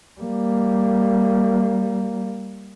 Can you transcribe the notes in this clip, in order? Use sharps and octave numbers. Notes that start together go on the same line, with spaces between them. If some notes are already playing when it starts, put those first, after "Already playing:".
G3 A#3